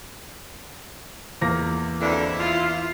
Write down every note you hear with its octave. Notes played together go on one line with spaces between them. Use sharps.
E2 A#3 A#6
F2 B2 D3 E4
F4